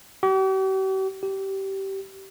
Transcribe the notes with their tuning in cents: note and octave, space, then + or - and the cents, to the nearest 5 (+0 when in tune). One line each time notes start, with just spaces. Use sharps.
G4 -45
G4 -20